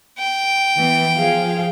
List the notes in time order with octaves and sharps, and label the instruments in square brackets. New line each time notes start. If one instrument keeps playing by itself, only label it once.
[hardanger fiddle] G5
[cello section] E3 B3
F3 G#4 F5